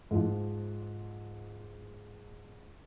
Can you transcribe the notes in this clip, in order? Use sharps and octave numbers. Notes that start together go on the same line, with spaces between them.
G#2 F3